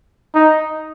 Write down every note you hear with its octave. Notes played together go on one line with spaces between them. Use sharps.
D#4